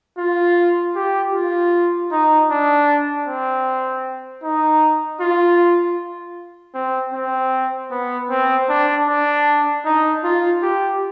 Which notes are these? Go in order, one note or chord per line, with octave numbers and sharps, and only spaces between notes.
F4
G4
F4
D#4
D4
C4
D#4
F4
C4
C4
B3
C4
D4
D4
D#4
F4
G4